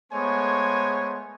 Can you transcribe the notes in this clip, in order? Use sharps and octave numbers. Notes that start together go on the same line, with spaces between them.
G#3 A3 B3 C5 C#5 G#5